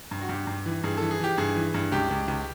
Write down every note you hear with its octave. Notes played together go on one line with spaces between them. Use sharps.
G2
F#4
G2 G4
G2
E3
G2 G#4
E3 A4
G#4
E3 G4
G2 G#4
E3
G2
C#2 G4
C#2
C#2